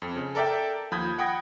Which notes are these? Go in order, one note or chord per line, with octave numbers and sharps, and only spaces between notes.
F2
C#3
A4 A#4 D5 E5 G5 A5
D#2 F3 B5 D#6 G6 G#6
F#5 G5 B5 D#6 G#6 A#6